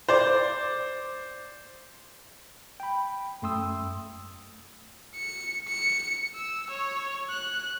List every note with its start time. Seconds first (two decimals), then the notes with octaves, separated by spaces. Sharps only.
0.08 C5 D5
2.80 G5 B5
3.42 F#2 A3 G5 C6 D#6 E6
5.15 C#7
5.68 C#7
6.35 E6
6.70 C#5
7.30 F#6